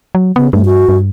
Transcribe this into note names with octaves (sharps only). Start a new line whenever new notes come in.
F#3
C#3 B3
G2 A3
F#4
G2